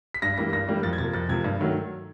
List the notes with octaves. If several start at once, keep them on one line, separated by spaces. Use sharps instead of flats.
B6
G2 A#6
E3 G3 A#3 A#6
G2 A#6
E3 G3 A#3
F2 A6
G#6
C3 F3 A#3 A6
F2 A6
C3 F3 A#3 G#6
G2
D#3 F#3 A3